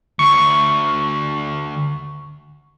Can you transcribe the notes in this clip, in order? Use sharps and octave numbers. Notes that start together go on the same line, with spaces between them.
D2 C#6